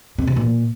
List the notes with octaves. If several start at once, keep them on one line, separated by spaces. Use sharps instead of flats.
C3
E2
A#2